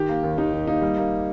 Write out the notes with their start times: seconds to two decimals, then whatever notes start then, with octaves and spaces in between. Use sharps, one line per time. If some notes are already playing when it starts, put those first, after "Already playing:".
Already playing: D#3 G4
0.09 A#3
0.23 D#2
0.38 D#2 D#4
0.53 D#3
0.67 A#3 D#4
0.82 G3
0.97 A#3